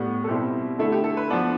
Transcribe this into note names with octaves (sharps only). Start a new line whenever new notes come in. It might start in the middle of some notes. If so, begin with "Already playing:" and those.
Already playing: A2 G3 B3
A4
B2 G3 C4 E4 G4
D3 A3 E4 A4
G4
A4
B4
F3 B3 D4